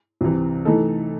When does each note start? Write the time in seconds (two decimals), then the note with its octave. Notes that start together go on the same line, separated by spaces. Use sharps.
0.21 C2 C3 E3
0.65 E3 A3 D#4 A4